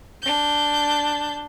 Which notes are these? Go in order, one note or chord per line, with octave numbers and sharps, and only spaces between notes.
D4 G6